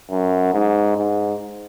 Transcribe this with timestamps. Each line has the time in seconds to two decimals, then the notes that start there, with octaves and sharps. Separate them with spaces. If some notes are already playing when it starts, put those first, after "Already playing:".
0.11 F#2
0.54 G#2
0.96 G#2